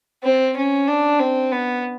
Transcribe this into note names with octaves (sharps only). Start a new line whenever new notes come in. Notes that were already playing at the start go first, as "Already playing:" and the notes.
C4
C#4
D4
C4
B3